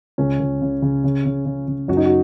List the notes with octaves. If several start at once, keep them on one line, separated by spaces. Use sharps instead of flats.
C#2 C#4
C#2
C#3
C#3
C#3
C#3
C#3
C#3
F#2 F#4
D#4
F#4